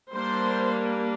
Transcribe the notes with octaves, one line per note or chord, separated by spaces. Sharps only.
G3 A#3 D4 C5